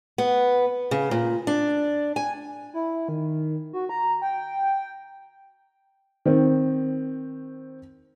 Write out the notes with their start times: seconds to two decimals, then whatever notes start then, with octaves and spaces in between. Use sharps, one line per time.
0.18 B3
0.91 C#3
1.11 A#2
1.47 D4
2.16 G#5
2.74 E4
3.08 D#3
3.73 F#4
3.89 A#5
4.22 G5
6.25 D#3 C4